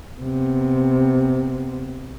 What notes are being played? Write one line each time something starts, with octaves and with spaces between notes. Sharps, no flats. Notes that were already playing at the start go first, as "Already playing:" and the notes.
C3 B3